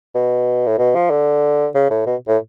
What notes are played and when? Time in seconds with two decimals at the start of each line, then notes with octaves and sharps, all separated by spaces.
0.15 B2
0.67 A2
0.78 B2
0.95 F3
1.10 D3
1.75 C#3
1.90 A2
2.06 B2
2.28 A2